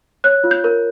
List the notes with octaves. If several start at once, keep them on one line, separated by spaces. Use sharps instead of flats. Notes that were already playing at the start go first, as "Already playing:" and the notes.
C#5 F#6
F4
G6
A#4